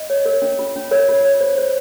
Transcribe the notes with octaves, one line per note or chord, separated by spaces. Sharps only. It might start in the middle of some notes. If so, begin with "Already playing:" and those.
Already playing: D#5
C#5
A#4
C#4
F4
C#4
A#4 C#5
F4
C#5
C5
C5